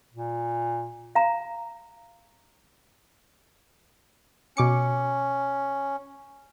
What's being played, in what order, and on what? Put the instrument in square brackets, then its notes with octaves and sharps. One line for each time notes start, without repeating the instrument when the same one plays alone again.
[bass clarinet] A#2
[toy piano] F5 A#5
[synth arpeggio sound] B2 D6 C#7 [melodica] C#4